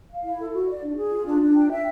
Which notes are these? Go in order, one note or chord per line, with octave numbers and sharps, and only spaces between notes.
F5
E4
A4
F#4
D5
D4
G#4
F4
D4
D4
G5
E5